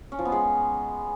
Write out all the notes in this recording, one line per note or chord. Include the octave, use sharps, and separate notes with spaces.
C#4
F3
B3
G#3